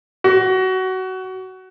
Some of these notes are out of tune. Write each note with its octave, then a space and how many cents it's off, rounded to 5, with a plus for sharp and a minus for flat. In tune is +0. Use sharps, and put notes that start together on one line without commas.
F#4 +20